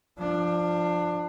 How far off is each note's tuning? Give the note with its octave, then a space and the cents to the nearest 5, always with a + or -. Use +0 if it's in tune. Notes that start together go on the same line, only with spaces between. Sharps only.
F3 +0 D4 +20